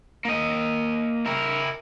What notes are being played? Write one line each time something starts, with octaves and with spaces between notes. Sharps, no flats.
A#3 D#5
E4 A#4